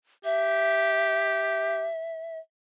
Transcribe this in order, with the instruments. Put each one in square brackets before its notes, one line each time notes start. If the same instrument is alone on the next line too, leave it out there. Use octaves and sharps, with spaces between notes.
[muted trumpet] G4 [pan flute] E5